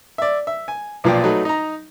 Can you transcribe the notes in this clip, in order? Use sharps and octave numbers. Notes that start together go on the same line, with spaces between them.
D5 E5
E5
G#5
B1 A#2 F3 D5 G5
F#3 A3 D#4 B4
D#4 A#5